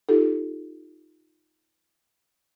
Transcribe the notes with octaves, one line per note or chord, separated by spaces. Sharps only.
D#4 F4 G4 A4